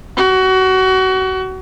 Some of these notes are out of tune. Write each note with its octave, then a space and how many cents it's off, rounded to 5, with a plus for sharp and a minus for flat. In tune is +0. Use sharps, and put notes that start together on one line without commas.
F#4 +25